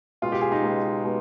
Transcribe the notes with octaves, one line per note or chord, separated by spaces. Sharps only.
C#2 B2 G#3 B3 F4
G4
G#4
D#4
C#2 B2 G#3 B3
B2 G#3 B3